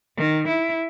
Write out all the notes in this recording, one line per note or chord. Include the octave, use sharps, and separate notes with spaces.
D#3
E4